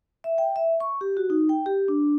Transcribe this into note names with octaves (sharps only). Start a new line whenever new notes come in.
E5
G5
E5
C#6
G4
F#4
D#4
G5
G4
D4